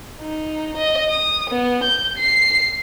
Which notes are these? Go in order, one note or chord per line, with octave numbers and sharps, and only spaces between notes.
D#4
D#5
D#6
B3
G6
C7